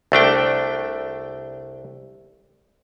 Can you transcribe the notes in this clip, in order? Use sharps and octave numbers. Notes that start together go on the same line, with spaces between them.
C2 A3 D4 G5